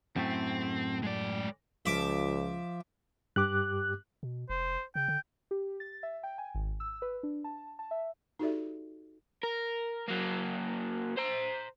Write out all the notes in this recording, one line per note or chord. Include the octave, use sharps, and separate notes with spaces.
F#2 A2 A3 C4
G#3 D5
C#2 F3 E5 D6
G2 G4 D6 F#6
B2
F1 C5
C#3 G5
D3
G4
A6
E5
G5
G#5
G#1
E6
B4
D4
A5
A5
E5
D#4 F#4 G4 A4 D5 E5
A#4
F#3 A#3
C5 A#5